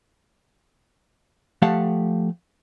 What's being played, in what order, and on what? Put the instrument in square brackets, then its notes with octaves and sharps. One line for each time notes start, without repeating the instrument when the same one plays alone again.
[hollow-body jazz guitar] F3 A3 G4 F5 F#5 A5